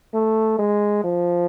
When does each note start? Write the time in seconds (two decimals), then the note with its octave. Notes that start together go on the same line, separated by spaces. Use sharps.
0.14 A3
0.59 G#3
1.04 F3